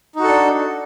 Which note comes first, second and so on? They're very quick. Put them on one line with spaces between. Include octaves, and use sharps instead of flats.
D#4 F#4 A4 D4